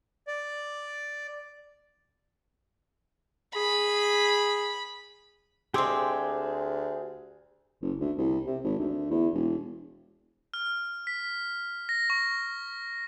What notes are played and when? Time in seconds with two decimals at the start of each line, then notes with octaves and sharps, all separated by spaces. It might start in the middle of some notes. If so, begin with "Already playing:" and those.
0.27 D5
3.56 G#4 B5
5.74 D2 G#3 C4 G4 G#4 D6
7.82 F#1
8.00 D2
8.18 C2
8.47 C3
8.64 G#1
8.79 D2
9.10 E2
9.34 E1
10.54 F6
11.07 B6
11.89 A#6
12.10 C#6